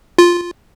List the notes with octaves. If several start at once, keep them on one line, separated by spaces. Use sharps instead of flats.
F4